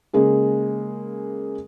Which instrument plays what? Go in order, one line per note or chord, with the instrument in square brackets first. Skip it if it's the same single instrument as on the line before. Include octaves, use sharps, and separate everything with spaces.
[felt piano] C#3 G#3 A#3 G#4